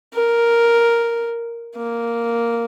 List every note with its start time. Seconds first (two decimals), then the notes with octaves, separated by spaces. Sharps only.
0.14 A#4
1.76 A#3